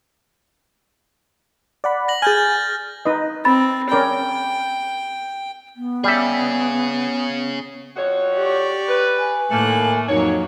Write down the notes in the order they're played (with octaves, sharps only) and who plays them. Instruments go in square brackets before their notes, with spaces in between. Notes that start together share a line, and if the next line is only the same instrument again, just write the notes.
[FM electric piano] D5 F#5 B5
[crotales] A#6 F#7
[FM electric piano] G#4 G#5 [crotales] F6 G6 A6
[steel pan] D#4 B4 D#5
[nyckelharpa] C4 [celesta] B5 A6
[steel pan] C#4 A#4 D5 [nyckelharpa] G5 [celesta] B5
[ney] B3
[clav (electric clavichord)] G3 E5 [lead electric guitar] C#4 G#4
[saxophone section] F2 F#4 C#5
[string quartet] G4 D5 C#6
[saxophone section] B4
[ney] G#5
[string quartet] A2 D#3 F#6 [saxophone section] A3 A#3
[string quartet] F2 F#3 A#3 [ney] D#4 [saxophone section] C#5